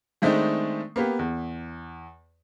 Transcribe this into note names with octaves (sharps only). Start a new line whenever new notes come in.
D#3 G#3 A3 C4 D4 D#4
A#3 B3 G4
E2